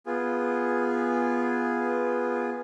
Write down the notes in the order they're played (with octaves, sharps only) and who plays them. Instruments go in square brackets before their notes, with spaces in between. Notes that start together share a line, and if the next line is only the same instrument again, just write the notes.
[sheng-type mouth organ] B3 F4 G#4